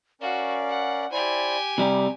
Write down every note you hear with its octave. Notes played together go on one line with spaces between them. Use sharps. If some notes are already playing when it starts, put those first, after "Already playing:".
C#4 F#4 A#4 D5 F5
F#5
E4 G4 C5 D5 G#5
C3 G3 A#5 B5